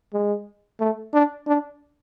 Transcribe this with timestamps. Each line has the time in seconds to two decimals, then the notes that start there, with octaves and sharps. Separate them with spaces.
0.14 G#3
0.80 A3
1.13 D4
1.47 D4